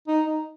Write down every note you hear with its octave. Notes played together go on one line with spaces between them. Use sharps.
D#4
D#4